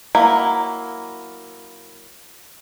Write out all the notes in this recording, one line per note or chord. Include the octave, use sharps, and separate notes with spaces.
F#3 A#3 E4